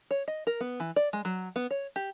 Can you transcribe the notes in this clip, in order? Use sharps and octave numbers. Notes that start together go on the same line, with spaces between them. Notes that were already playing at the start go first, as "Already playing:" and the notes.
C#5
D#5
A#4
B3
E3
D5
G#3
F#3
B3
C#5
G4